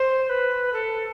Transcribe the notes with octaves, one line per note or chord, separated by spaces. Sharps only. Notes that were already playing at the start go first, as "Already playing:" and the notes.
Already playing: C5
B4
A4